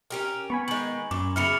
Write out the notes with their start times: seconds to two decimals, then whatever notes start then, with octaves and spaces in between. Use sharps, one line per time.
0.10 C#4 G4 A#4
0.50 B3 G#5 B5 C#6
0.68 D#3 G#3 F#7
1.11 F#2 A#2 D6
1.36 C#3 B3 E4 F6 C#7 F7